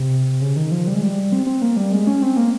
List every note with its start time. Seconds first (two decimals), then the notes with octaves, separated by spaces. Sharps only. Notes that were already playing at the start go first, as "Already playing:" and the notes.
Already playing: C3
0.42 C#3
0.56 D#3
0.71 F3
0.87 G3
0.94 G#3
1.02 G3
1.32 C4
1.47 C4
1.62 A#3
1.77 G3
1.92 G#3
2.07 C#4
2.22 C4
2.37 A#3